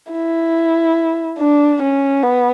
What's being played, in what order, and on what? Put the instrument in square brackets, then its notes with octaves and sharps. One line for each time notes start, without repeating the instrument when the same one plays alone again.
[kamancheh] E4
D4
C#4
B3